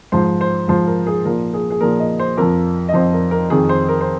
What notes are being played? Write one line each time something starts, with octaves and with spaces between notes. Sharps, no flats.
G#2 F3 C5
C5
G#2 F3 C5
A#4
G#4
A#2 F3 A#4
G#4
G#4
A#2 F3 A#4
D#5
C5
F2 F3 A#4
D#5
F2 F3 C5
A#4
A#4
F2 D#3 G#4
C5
A#4
C5